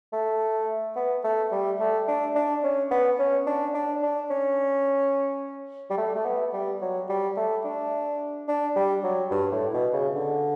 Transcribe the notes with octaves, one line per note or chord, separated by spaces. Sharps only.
A3
B3
A3
G3
A3
D4
D4
C#4
B3
C#4
D4
D4
D4
C#4
G3
A3
A3
B3
G3
F#3
G3
A3
D4
D4
G3
F#3
G2
A2
B2
C#3
D3